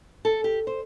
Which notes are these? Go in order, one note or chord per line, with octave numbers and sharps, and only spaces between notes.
A4
G4
C5